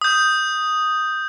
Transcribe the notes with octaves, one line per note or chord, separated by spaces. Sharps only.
D#6 G6